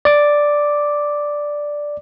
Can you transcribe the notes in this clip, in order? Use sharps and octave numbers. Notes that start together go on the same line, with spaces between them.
D5 D6